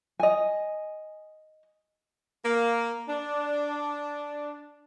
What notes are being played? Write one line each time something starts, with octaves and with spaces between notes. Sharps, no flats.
D#5 G#5
A#3
D4